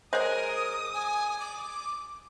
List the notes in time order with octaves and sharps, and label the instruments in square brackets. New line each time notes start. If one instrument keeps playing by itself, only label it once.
[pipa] G#3 G#4 [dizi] A#4 [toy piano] C5 C#5 [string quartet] D#6
[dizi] G#5
D6